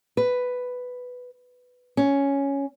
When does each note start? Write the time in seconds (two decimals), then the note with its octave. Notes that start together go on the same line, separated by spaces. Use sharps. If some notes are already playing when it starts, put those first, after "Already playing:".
0.17 B4
1.97 C#4